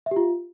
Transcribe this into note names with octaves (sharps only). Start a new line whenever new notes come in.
E5
G4
F4